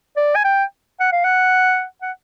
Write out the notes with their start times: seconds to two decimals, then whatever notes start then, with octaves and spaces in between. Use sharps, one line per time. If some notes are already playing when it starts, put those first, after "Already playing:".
0.17 D5
0.36 G#5
0.45 G5
1.00 F#5
1.12 F5
1.24 F#5
2.02 F#5